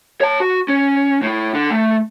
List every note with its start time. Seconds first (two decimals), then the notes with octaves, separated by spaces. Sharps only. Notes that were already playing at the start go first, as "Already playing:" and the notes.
0.21 C#5 A5
0.40 F#4
0.68 C#4
1.22 A2 E4
1.54 D3
1.71 A3